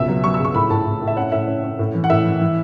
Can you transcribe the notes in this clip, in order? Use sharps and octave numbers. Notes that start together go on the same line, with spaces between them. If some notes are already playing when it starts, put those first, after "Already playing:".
Already playing: C#2 B2 E5
F#3
F#3 C#6
E6
C#3
C#6
A2 B5
A2 A5
A2
A2
E5
C#4 F#5
A2 E5
C#4
C#4
A2
E3
F#5
A2 E5
E3
E3